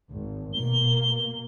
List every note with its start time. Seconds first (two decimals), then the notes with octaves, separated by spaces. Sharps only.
0.11 G#1
0.54 B2 A#3 G7